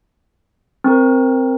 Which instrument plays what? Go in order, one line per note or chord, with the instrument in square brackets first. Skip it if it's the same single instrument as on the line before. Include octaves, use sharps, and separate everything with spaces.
[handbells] C4 A#4